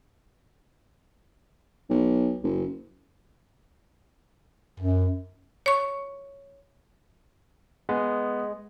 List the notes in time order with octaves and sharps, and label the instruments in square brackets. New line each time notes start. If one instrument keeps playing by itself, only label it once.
[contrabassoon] B1
F#1
[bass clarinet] F#2
[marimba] C#5 C#6
[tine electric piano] G#3 [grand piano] B3